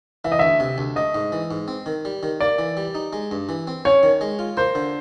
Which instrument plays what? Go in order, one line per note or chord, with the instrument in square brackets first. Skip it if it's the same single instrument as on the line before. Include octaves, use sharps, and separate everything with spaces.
[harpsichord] E3 [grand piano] E5
[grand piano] D#5
[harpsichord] D2 [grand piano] E5
[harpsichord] C3
D2
[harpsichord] A3 [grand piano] D#5
[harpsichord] G#2
E3
G#2
C4
D#3
G3
D#3
[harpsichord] A#3 [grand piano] D5
[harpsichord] E3
G3
D#4
G#3
G2
E3
C4
[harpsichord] C#4 [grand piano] C#5
[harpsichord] D#3
G#3
F4
[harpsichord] A#3 [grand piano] C5
[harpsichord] D3